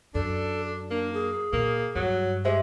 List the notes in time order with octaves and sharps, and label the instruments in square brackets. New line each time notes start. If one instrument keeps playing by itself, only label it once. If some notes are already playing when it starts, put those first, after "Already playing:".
[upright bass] F#2 [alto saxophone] D4 [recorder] A4
[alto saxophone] A#3 [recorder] D4
[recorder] G#4
[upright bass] A#2 [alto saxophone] A#3
[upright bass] G2 [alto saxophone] F#3
[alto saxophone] G#3 [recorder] G4 [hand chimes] C5 E5